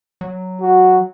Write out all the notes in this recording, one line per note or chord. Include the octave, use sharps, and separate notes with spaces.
F#3
F#4